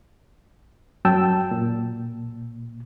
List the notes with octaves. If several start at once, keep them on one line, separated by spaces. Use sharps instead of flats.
F#2 F#3 G5 A5 E6
A#2